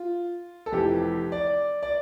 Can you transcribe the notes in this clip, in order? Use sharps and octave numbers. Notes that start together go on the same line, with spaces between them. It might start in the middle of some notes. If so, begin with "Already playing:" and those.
Already playing: F4
A4
F1 F2 E3 G4
D5
D5